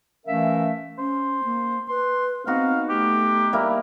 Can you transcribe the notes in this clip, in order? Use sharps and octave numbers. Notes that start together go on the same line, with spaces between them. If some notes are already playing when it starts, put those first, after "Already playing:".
E3 A3 C#4 A#4 E5 F5
C#4 C5
A#3
B4 C6
B3 C4 D#4 F#4 F5
A3 G4
G3 A#3 E4